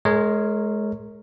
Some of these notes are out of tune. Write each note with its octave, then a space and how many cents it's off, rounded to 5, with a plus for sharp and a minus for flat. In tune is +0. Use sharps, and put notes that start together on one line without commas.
G#3 +30 A#4 -10 C#5 +0